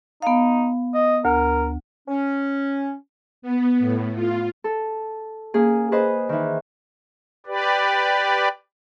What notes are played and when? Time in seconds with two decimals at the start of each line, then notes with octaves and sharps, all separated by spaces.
0.22 B3 D#4 F5
0.94 D#5
1.25 D2 A#4
2.08 C#4
3.42 B3
3.79 A2
4.15 F4
4.64 A4
5.54 A#3 C#4 G#4
5.92 G#4 B4 C5 D#5 D#6
6.29 D#3 E3
7.46 G4 B4 D5